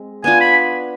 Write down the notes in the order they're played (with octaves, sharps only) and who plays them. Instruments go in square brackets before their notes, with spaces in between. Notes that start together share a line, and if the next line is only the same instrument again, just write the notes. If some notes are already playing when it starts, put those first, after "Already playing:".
Already playing: [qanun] G#3 C4
[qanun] B3 D4 F4 [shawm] G#5
[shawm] B5